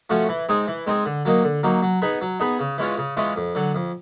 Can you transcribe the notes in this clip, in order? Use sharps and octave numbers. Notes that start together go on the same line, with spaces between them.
F3 A3 C#4 F#4
E3
G#3 C4 D#4 G#4
E3
G#3 C4 D#4 G#4
D3
F#3 A#3 D#4
D3
F#3 A#3 D#4
F#3
B3 D#4 G#4 B4
F#3
B3 D#4 G#4 B4
C#3
E3 G#3 C#4 F4
C#3
E3 G#3 C#4 F4
F2
D3 F#3
F2